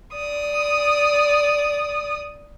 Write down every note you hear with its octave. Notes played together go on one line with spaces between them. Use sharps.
D5 D#6